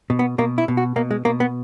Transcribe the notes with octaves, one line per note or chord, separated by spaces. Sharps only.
B2
B3
B2 A#3
E4
B2
F#4
B2 A#3
G#3
B2 A#3
B3